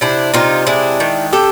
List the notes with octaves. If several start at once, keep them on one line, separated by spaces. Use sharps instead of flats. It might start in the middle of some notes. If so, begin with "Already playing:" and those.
C3 D4 E4
C3 D#4 F4
G#3 D4 E4
D#3
C3 G4 A4